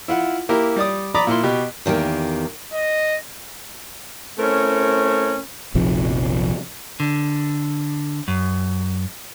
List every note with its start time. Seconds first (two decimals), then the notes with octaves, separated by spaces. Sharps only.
0.08 E4 F4 F#5
0.49 A#3 E4 G4 A#4
0.76 G3 D5 D#6
1.14 D5 A#5 B5 D6 D#6
1.27 A#2 E4 C6
1.43 B2 G4
1.86 E2 D#3 A#3 G4
2.73 D#5
4.39 A3 C4 C#4 E4 A#4
5.75 F1 A#1 C3 F3
7.00 D3
8.28 F#2